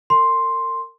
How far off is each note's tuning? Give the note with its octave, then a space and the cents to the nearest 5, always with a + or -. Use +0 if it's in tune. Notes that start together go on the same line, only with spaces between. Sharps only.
A#4 -30 C6 +5